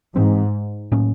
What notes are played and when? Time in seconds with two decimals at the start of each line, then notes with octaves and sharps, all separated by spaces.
0.15 G#2 E3 G#3 C4
0.92 A2 F#3 A#3 C#4